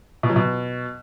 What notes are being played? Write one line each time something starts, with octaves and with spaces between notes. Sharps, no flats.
B2
F#3
B2